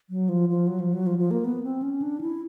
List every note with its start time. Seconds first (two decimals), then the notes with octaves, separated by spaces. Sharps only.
0.10 F#3
0.29 F3
0.49 F3
0.67 F#3
0.80 F3
0.93 F#3
1.07 F3
1.19 F3
1.31 A#3
1.45 B3
1.63 C4
1.82 C#4
2.02 D4
2.21 E4